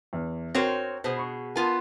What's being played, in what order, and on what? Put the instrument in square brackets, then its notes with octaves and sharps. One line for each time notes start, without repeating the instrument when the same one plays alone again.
[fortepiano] E2
[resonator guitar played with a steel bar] C4 C5 C#5 [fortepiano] F#4 A#4 G5
[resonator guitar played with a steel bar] B2 G#4 [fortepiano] C5
[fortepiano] B5 C#6
[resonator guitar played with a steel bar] B3 F4 G#5 [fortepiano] A#4 A5